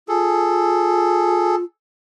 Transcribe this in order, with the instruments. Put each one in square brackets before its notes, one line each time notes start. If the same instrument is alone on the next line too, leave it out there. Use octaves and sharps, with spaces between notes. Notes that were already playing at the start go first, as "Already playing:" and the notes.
[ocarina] F4 [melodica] G#4 A4